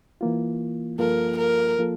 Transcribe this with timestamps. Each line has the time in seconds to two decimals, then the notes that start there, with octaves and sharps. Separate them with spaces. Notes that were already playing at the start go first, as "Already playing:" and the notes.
0.21 E3 A#3 F4
0.99 G2 F3 A#3 F4 A4 A#4
1.38 A#4
1.78 F3 A#3 F4 A4